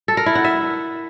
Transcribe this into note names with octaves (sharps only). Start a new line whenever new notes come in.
A4
A#4
E4
F#5
E5